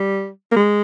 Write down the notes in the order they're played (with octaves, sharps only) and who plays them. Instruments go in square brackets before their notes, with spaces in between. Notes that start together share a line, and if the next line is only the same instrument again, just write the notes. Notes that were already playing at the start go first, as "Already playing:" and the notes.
Already playing: [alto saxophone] G3
A#3
G#3